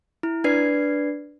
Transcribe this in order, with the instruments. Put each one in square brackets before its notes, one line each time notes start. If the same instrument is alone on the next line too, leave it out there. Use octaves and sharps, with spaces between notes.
[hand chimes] E4
D4 B4 D5 G#6 C7